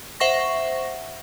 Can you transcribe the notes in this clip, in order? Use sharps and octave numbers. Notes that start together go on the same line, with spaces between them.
C5 E5 F#5 C#6 A#6